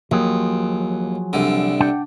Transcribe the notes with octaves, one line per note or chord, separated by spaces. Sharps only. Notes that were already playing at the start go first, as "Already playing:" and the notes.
D#2 F3 F#3 G#4
C2 D3
D4 F#5 G5